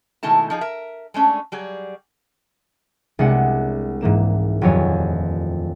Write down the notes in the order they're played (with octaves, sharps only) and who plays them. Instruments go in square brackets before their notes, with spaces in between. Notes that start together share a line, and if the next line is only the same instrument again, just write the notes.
[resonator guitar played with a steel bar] B2 D#3 G#3 A3 E4 A5
F3 D#4 G#4
A#4 E5
G#3 A3 C#4 D4
F#3 G3 G#4
[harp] C2 G#3 B3 D4 F#5 C#7
G#2 E3 A#3 E7
D#1 F2 F#3 G4 C#5 G#5